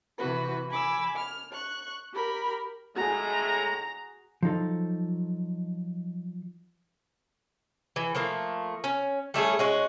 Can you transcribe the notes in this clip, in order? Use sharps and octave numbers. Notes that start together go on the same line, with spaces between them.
C3 E3 F#4 B4
G#5 B5 D6 E6
F6
C#6 F#6
G4 A#4 B5
A2 G#3 F#4 G#4 A#5
F3 F#3 D#4 A4
E3
F3 A3 A#3
C#4
G3 A3 C#4 G#4
G#3 C#4 F#4